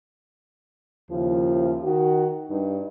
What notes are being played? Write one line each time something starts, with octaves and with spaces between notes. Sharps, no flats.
D#2 C#3 F3 E4 F4
D#3 F#4
G2 D#4